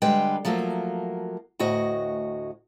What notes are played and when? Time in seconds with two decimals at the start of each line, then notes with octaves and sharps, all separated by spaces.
0.02 D3 G3 G#3 B4 G5
0.45 F3 F#3 A3 A#3 A#4
1.59 D2 A2 F#4 D#5